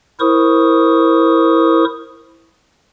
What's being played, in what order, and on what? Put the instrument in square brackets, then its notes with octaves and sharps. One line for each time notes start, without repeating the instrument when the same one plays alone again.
[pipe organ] E4 A#4 C5 C#6 D#6